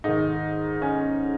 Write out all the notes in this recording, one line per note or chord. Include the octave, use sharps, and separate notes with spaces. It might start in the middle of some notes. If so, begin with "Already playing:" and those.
G#2 D#3 D#4
C#4